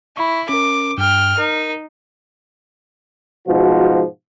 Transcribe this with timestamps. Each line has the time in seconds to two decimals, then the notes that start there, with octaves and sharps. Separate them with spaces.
0.17 E4 B5 C#6
0.49 C#4 A#4 D6
0.98 G2 G5 F6
1.38 D#4 A#4
3.48 G#2 B2 F3 F#4